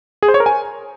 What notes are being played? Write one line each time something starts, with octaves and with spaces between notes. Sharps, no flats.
G#4
C5
C#5
A#4
G#5